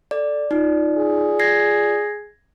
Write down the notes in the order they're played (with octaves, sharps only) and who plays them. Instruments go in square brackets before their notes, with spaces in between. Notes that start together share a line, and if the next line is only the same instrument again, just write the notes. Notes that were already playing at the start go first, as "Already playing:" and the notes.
[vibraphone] A4 [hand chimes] D5
[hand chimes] D#4 [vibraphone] F4 D5
[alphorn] G#4
[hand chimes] G#6 A#6 C7